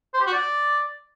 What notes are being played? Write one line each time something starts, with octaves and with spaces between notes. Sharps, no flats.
C5
G4
F#4
D5